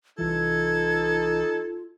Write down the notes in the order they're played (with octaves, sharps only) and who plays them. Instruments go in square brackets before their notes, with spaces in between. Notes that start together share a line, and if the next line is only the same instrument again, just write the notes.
[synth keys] C2 E3 [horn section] D#4 A4 [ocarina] F4 [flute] G#6